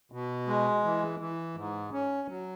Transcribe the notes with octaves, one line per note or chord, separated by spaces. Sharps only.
B2
G#3
E3
E3
G#2
C#4
F#3